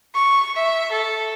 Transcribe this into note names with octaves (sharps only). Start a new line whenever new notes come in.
C#6
E5
A4